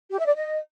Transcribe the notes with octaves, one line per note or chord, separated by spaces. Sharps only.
G4
E5
D5
D#5